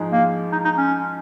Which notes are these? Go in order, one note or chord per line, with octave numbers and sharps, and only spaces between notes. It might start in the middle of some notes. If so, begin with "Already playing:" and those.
Already playing: G#2 F3 G#3 D#4 G#4
A#3
D#4
D#4
C#4